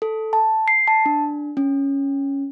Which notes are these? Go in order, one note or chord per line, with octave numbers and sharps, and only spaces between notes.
A4
A5
C7
A5
D4
C#4